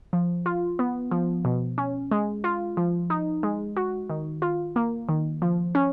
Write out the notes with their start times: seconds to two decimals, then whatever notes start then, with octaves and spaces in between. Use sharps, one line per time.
0.13 F3
0.46 F4
0.79 B3
1.11 F3
1.45 B2
1.78 C#4
2.11 G#3
2.44 F4
2.77 F3
3.10 D#4
3.43 G#3
3.77 F#4
4.10 D#3
4.42 F4
4.76 A#3
5.09 D#3
5.42 F3
5.75 C#4